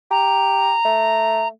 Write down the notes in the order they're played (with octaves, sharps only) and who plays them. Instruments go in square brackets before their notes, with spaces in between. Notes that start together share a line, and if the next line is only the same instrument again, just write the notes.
[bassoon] G4 [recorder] A#5
[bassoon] A3